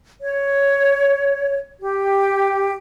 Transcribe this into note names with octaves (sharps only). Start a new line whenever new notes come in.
C#5
G4